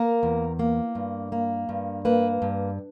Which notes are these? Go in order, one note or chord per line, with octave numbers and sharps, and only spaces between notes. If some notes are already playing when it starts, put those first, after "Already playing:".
Already playing: A#3 A#4
E2
A#3
G2
A#3
G2
A#3 B4
G2